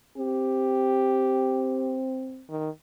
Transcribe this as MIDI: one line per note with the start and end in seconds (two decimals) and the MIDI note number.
0.18 2.45 60
0.18 1.97 67
2.50 2.69 51